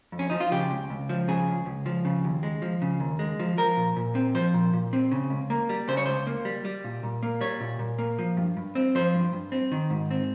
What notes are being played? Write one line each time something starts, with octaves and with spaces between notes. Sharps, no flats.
F2
C#4
F3 D#4
F4
C#3 G4
C#2
C#2
F3
C#3 G#4
C#2
C#2
F3
C#3
D#2
G#3
F3
C#3
D#2
G#3
F3
F3 A#4
A#2
A#2
C4
F3 C5
A#2
A#2
C4
C#3
C#2
A#3
G3
C#3 C5
C#5
C#2 C5
A#3
G3
G3
A#2
A#2
A#3
G3 C#5
A#2
A#2
A#3
F3
G2
G2
C4
F3 C5
G2
G2
C4
D#3
G#2
C4